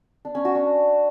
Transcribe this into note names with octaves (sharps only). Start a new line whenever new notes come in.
D4
C#4
F#4
D4